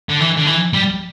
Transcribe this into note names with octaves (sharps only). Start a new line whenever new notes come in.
D3
E3
D3
E3
G3